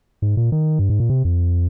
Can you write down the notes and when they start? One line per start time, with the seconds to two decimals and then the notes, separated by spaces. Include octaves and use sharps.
0.22 G#2
0.37 A#2
0.52 D#3
0.79 G2
0.90 G#2
1.00 A#2
1.10 C3
1.25 F2